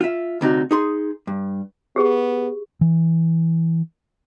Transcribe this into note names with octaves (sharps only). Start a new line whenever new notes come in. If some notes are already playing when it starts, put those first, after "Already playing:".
F4 E5
D2 C3 D#4 F#4
D#4 G#4 C6
G2
B3 G4 G#4
E3